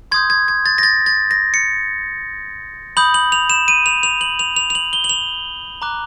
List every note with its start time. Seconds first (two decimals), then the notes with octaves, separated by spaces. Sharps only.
0.11 C6 D#6 G6 G#6
0.30 G#6
0.48 G#6
0.66 A6
0.78 A#6
0.83 A6
1.06 A6
1.31 A#6
1.54 C#7
2.97 B5 D#6 G6 F#7
3.14 F#7
3.32 F7
3.50 E7
3.68 D#7
3.86 F7
4.03 F7
4.21 F#7
4.39 F7
4.56 F7
4.70 F7
4.75 F#7
4.93 G7
5.04 F#7
5.09 F7
5.82 A#5 D6 F#6